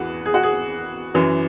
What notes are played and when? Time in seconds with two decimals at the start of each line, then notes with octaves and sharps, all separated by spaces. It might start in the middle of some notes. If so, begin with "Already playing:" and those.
Already playing: E2 E3 F#4 G#4 B4
0.26 G#4
0.34 F#4
0.43 G#4
1.14 F#2 E3